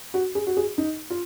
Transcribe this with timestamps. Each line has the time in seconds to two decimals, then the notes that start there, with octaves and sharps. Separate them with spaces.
0.14 F#4
0.35 G#4
0.47 F#4
0.57 G#4
0.78 D#4
1.10 F4